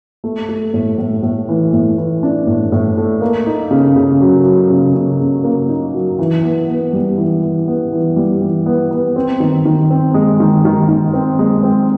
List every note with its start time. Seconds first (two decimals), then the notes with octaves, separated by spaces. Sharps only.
0.24 A3
0.49 A3
0.74 A2
0.98 A2
1.23 A2
1.49 E3
1.73 A2
1.98 E3
2.23 D4
2.47 A2
2.72 A2
2.97 A3
3.21 A#3
3.46 D#4
3.71 C#3
3.96 C#3
4.21 F#3
4.45 F#3
4.70 C#3
4.94 C#3
5.20 C#3
5.44 A#3
5.69 D#4
5.94 F#3
6.19 E3
6.43 B3
6.68 B3
6.93 G3
7.17 E3
7.43 E3
7.68 B3
7.92 E3
8.16 G3
8.41 E3
8.66 B3
8.91 B3
9.16 C4
9.40 D#3
9.65 D#3
9.90 C4
10.14 G#3
10.40 D#3
10.65 D#3
10.89 D#3
11.13 C4
11.39 G#3
11.63 C4